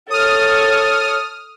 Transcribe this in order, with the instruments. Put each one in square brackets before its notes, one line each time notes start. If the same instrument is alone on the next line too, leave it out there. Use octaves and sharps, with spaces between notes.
[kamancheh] A4 C#5 [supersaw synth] D#6 F6